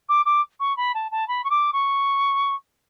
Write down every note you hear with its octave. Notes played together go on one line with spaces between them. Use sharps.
D6
D6
C#6
B5
A5
A5
B5
C#6
D6
C#6